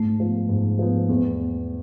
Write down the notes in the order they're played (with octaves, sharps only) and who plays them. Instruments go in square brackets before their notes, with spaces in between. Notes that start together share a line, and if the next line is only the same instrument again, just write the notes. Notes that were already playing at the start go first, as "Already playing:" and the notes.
Already playing: [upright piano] G#2 [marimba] A3
[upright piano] F3 B3
G#2
F3 B3
E2